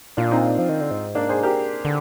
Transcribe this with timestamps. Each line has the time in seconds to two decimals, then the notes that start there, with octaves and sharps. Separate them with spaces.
0.17 A#2 D4 F4
0.31 C4 D#4
0.59 F3
0.69 D#3
0.81 D3
0.91 G#2
1.15 A#3 D4
1.29 G#4 C5
1.43 G4 A#4
1.85 D3